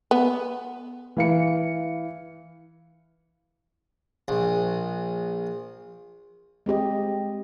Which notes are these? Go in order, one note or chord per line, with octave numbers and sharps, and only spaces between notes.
B3
E3 F5 C#7
A#1
G#3 C4 G4 D#5